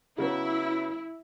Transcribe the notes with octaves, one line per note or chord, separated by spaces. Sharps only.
C#3 F#3 B3 E4